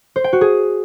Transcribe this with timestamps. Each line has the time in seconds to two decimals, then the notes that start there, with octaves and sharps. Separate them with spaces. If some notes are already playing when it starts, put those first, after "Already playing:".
0.16 C5
0.24 G5
0.33 F#4
0.41 G#4